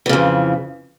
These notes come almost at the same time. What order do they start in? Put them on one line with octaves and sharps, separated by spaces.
E3 C#3 F2